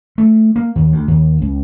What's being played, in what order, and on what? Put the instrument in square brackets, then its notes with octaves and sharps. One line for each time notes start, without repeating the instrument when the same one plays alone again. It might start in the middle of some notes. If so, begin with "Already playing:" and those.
[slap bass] A3
A#3
D#2
D2
D#2
C#2